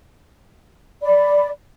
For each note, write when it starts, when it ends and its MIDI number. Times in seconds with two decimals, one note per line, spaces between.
1.02 1.48 74
1.02 1.48 83